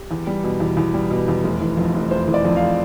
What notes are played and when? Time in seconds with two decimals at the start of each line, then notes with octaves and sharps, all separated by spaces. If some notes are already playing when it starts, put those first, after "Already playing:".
Already playing: G4
0.11 E2
0.27 G3
0.44 B2
0.60 E2
0.77 E2
0.94 G3
1.10 B2
1.28 E2
1.44 F1
1.60 E3
1.77 F2
1.94 F1
2.11 F1 C5
2.27 E3
2.34 D5
2.45 F2
2.56 F5